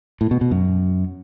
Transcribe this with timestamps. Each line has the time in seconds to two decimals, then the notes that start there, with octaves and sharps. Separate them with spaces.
0.21 A2
0.31 B2
0.41 B2
0.51 F#2